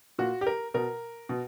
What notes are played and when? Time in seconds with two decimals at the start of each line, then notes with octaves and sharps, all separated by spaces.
0.19 A#2 F#4
0.41 G4
0.47 A#4
0.74 B2 A#4
1.29 B2